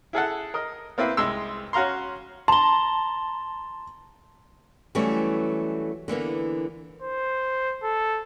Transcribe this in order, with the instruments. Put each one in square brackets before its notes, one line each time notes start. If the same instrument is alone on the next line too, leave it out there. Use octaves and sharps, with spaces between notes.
[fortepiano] E4 G#4 A4 F#5
A#4 D#5
A#3 C4 E4 B4
C2 G#3 C6 E6
C#4 F#4 F5 A#5 C6
[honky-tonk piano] A5 A#5 [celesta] C6 G7
[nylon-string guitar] E3 F#3 G3 A3 C#4
D3 E3 A#3 B3
[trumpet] C5
A4